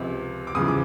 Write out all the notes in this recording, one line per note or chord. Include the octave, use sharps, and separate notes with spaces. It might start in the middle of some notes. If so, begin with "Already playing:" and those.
Already playing: C#2 C3 F3
D6
E2 C#3 F3 D#6
D6